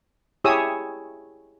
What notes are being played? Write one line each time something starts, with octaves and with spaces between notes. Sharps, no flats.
E4 G4 G#4 C#5 D#6 E6